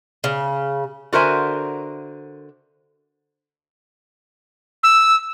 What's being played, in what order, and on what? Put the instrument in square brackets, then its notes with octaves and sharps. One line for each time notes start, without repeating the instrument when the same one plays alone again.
[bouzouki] C#3
[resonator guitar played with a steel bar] D3 F#4 A#4 C5 E5 G#5
[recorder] E6